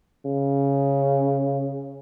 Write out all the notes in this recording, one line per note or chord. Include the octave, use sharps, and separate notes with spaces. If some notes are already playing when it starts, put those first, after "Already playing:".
C#3